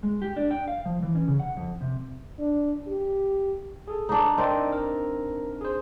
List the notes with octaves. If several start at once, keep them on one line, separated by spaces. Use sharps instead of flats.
G#3
G4
D4
G5
F5
F3
E3
C#4
C#3
F#5
F2
C3
D4
G4
G#4 A4
D4 D#4
C4 D#4 A#4 D5
A#4
G#4 C5